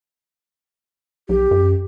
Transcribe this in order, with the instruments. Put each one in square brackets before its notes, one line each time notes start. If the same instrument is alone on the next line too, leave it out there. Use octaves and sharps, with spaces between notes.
[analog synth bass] B1 [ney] G4
[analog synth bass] F#2